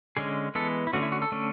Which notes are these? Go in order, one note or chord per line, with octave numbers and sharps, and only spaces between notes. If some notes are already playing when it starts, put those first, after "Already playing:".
D3 G#3 C#4 G#4
E3 G#3 B3 A4
E4
D3 A3 C#4 F#4
E4
F#4
A4
D3 A3 C#4